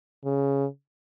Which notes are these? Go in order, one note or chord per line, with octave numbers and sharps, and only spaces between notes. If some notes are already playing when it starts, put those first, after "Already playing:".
C#3